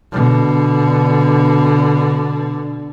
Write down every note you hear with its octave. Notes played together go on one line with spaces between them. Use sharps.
B2 D3